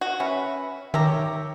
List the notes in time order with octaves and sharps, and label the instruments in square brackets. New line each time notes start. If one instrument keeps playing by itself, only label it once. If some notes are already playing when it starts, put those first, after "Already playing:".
[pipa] F#4
[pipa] C#4 [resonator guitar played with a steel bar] B4 E5
[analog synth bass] D#3 [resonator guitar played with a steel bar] G4 C#5 G5 [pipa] E5 A#5